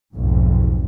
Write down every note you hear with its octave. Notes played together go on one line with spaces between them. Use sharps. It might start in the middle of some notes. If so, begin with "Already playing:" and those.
B1 F2 G#2